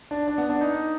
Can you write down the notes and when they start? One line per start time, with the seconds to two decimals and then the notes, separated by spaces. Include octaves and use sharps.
0.11 D4
0.28 D4
0.38 B3
0.50 D4
0.61 D#4